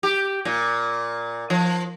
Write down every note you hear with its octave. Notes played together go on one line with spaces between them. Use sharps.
G4
A#2
F3